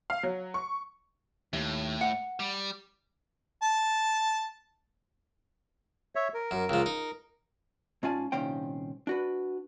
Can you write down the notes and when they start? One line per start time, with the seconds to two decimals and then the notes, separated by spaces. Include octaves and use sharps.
0.10 F5
0.23 F#3
0.54 C#6
1.53 D#2 A2
2.01 F#5
2.40 G3
3.63 A5
6.15 C#5 E5
6.34 A#4
6.51 F#2
6.69 C#2 F3
6.86 D#4
8.03 G#2 C#4 F4 D5 G#5 A5
8.32 C2 A#2 D#3 C#4 C5 G5
9.07 D4 F#4 B4